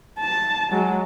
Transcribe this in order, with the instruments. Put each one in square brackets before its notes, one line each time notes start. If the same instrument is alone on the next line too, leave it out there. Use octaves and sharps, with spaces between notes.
[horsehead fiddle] A5
F#3 G#3